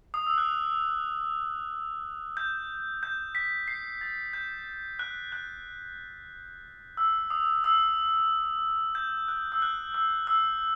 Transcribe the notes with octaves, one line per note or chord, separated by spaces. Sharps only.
D#6
E6
F#6
G6
G6
B6
C7
A6
G6
F#6
F#6
E6
D#6
E6
G6
F#6
E6
F#6
E6
E6